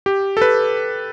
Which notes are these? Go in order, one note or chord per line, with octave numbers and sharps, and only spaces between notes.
G4
A4
B4